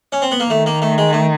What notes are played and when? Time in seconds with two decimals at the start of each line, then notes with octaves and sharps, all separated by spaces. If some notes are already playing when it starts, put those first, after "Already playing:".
0.12 C#4
0.22 C4
0.32 B3
0.40 A#3
0.50 D#3 A3
0.66 A#3
0.82 A3
0.98 G#3
1.13 A3